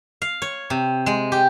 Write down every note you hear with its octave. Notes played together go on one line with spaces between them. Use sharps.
F5
C#5
C3
G#3
G4